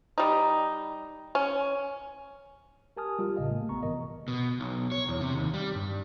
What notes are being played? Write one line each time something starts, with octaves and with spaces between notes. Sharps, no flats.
G3 D#4
C#4
G4 A#4 G#5 A5 D#6 F6
G3 F4 G4 A#4
A1 A2 C#3 D#5 F5
A3 A#3
A#1 B3 A#5 C#6
G#2 C3 E3 A#4 D#5
B2
B1
C#5
E2
C3
D#2
G3
G2